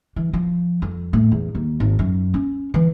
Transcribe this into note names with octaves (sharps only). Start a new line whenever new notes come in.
E3
F3
F2
A2
E2
D#2
G#1
F#2
C#4
E3